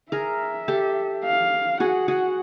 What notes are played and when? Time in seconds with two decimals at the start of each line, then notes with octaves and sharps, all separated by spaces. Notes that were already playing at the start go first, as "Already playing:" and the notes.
0.12 G#4 A#4 E5
0.68 G4 A4
1.24 F5
1.80 F#4 G#4 F#5
2.08 F#4 G#4